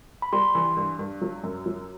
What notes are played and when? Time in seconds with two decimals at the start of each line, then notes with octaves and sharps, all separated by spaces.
0.22 B5
0.33 G3 C6
0.55 E3
0.77 G2
0.99 G2
1.21 F#3
1.44 F#2
1.66 F#3